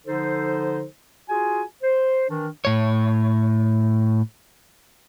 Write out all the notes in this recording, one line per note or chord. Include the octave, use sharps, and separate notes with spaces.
D3 F3 D#4 A4 C5
F4 F#4 G#4 G#5
C5
D#3 E3 D4
A2 C#5